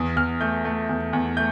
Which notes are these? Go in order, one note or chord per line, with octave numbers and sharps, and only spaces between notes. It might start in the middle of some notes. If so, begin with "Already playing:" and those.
Already playing: E2
E2 F6
A3 G6
A3
E2
E2
A3 G6